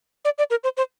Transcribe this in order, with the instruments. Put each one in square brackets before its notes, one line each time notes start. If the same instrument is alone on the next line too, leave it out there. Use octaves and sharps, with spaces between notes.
[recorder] D5
D5
A#4
C5
C5